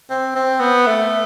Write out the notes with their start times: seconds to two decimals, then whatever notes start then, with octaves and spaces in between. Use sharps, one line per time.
0.10 C4
0.35 C4
0.60 B3
0.87 A3